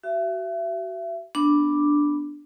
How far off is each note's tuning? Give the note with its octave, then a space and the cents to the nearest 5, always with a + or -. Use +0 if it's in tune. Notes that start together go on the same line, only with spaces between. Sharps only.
F#4 +35 E5 +30
B3 +0 D4 +0 D6 +0